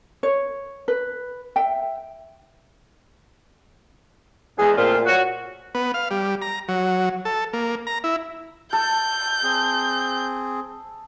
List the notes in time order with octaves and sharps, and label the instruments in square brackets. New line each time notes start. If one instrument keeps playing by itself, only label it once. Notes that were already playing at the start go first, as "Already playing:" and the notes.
[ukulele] C#5
B4
E5 G5
[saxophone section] E2 G#3 [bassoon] G#4
[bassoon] A#2 [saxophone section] A3 C4 F4
[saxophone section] F#4 C#5
[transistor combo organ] B3
F5
G3
A#5
F#3
A4
A#3
A#5
E4
[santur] A4 [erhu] G6
[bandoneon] C4 G#4